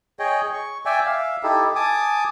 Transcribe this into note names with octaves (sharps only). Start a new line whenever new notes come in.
G#4 C#5 D#5 G5
C#6
D5 E5 G5 G#5
E5 F5
D#4 E4 G4 A4
G#5 A5 D6 D#6